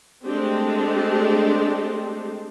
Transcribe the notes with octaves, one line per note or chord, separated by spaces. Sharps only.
G#3 A3 C4 D4 G4